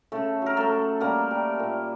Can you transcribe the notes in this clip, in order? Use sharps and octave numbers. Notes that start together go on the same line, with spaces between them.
C#3 A3 A4
F#3 A#4
A3 A4
A3
G3 A#3 A#4
G3
A#2